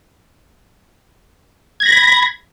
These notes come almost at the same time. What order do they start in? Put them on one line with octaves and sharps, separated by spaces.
G#6 A#6 B5